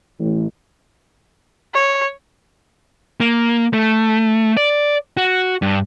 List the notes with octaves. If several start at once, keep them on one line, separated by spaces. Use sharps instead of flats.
A1
C#5
A#3
A3
D5
F#4
G2